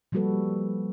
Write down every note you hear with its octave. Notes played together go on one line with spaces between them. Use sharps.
F3 G3 A#3 F#4 A4 B4